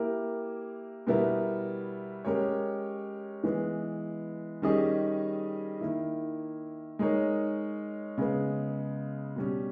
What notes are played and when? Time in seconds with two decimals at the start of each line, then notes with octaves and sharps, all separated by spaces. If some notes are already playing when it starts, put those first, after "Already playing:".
Already playing: A#3 E4 G4 A#4
1.07 B2 G3 B3 E4 A#4
2.25 G#3 C#4 G4 A#4 C#5
3.44 E3 G#3 B3
4.62 D#3 G3 C#4 G#4 D#5
5.81 D#3 A#3 E4
6.99 G#3 D#4 A#4 C#5
8.18 C#3 G#3 B3
9.36 B2 G3 C#4